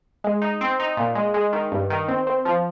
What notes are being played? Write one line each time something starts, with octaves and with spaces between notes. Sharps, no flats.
G#3
D#4
C4
D#4
A#2
G#3
G#3
D#3
G2
D#3
C4
C4
F3